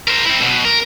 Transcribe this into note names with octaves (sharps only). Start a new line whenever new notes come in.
A#4 C5
C4 E4
B1 B2
A#4